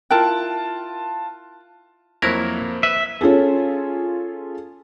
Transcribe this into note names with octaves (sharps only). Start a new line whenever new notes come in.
E4 F4 A#4 G5 A5 F#6
F2 F#3 A#3 E4 A#4 C5 G#6 A#6
B4 E5
C#4 F4 G#4 A4